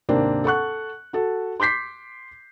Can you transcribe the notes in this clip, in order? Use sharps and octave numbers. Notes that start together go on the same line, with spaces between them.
D#2 G#2 C3 A#3 C4 D4
A4 F#5 C#6 F#6
F#4 A4
C6 D6 G6 B6 C7